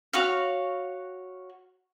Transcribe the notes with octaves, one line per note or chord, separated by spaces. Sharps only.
F#4 C#5 F5